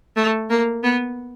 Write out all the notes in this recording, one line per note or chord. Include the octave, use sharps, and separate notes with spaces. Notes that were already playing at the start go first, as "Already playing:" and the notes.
A3
A#3
B3